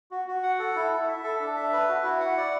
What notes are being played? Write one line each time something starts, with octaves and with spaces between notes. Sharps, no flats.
F#4
F#4
F#5
A4
E4
E4
E5
A4
D4
E5
B4
F#4
E4
F#5
D5